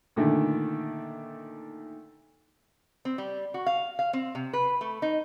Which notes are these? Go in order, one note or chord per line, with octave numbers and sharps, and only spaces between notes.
A#2 D3 D#3 A3
C4
G3
F#4
F5
F5
C4
C3
B4
A3
D#4